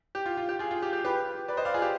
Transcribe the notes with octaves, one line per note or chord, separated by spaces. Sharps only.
G4
F4
F4
G4
F4 G#4
F4
G4
G4
G4 B4
B4 D5
C5 D#5
D5 F5
F4 G#4
G4